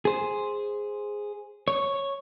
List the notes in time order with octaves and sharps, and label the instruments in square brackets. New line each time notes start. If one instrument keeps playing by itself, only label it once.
[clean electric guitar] G#4 C5
C#5